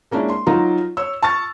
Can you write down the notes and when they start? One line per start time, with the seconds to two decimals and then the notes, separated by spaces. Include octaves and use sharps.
0.11 G#3 A#3 C#4 D4 E4
0.29 C6
0.46 F#3 D#4 F4 A#4
0.97 C#5 E6
1.22 A5 C#6 F6 A6